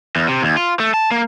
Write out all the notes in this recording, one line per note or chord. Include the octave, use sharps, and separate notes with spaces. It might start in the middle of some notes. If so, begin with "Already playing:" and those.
E2
C3
D#2
F4
A3
A5
A#3